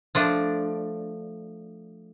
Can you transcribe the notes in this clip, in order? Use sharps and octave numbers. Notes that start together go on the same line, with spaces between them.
F3 A3 D4